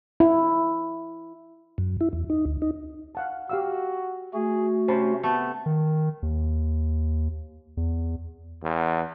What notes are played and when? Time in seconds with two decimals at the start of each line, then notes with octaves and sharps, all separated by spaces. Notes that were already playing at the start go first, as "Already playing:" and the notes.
0.20 E4
1.78 F#2
2.01 E4
2.13 E2
2.30 D#4
2.46 D2
2.62 D#4
3.15 F5 F#5 A5
3.49 F#4 G4 F5 E6
4.34 A3 F#4 G#4
4.88 C3 C#4 C5 A5 B5
5.23 A3 B3
5.66 D#3
6.23 D#2
7.77 E2
8.63 E2